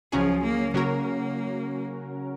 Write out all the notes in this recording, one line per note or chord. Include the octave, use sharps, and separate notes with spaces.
C#2 C#3 F3 F#3 C#4 G#4
A#3
C#3 F#3 A#3 C#4 F#4 A#4